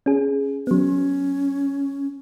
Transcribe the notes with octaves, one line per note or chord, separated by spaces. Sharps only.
C#4 G#4
F#3 B3 C#4